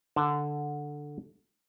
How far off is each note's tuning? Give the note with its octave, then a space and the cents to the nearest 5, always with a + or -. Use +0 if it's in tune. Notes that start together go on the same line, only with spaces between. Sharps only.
D3 +0 A5 +0